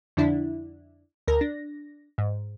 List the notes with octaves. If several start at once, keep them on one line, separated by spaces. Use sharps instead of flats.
F2 D3 D4 E4
D2 A#4 A#6
D4 A#6
G#2